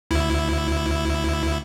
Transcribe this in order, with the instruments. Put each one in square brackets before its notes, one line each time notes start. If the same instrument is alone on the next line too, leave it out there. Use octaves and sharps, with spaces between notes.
[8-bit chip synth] D2 E4